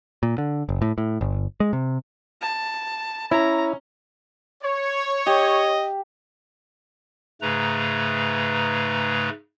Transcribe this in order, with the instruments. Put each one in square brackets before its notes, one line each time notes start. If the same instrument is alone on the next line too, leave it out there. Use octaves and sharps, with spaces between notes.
[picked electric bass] A#2
D3
F#1
A2
A2
G1
G#3
C3
[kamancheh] A5
[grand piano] C#4 [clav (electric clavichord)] E4 [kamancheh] A#5
[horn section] C#5
[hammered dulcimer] G4 [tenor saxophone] D#5
[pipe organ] G#2 C#3 A3 B4 A#5